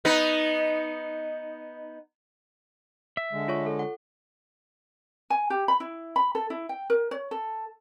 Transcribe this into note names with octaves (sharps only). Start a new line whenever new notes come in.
B3 D#4 B4
E5
D3 G#3
F4 C#5 C#6
A4
F#5
G#5
G4
B5
E4
B5
A4
E4
G5
A#4
C#5
A4